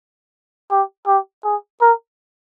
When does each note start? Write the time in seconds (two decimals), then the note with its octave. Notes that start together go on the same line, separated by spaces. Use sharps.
0.71 G4
1.07 G4
1.44 G#4
1.81 A#4